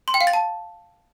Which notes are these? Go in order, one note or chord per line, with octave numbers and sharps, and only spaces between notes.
C6
G5
F5
A6
A5